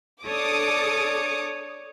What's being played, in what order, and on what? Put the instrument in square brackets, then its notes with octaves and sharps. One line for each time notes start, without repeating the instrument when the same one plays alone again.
[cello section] D4 A4 [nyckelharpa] C#5 D5 [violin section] D6 D#6 C#7